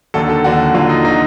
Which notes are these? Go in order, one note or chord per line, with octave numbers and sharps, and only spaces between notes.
D#2 D3 F#3 A4
A4
D#2 D3 F#3 F#4
D#2 D3 F#3 F4
D#4
D3 F#3 D#4